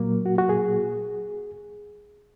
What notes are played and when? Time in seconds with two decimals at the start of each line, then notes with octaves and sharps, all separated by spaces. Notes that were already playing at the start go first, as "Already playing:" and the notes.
Already playing: A#2 F#3 A#3
0.26 F#4
0.38 F#4
0.49 G#4